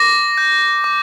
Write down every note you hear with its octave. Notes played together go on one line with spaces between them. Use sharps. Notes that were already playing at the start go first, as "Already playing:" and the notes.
Already playing: D6 A#6
G6
D6